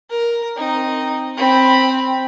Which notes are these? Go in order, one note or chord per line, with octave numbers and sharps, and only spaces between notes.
A#4
C4 D#4
C4 B5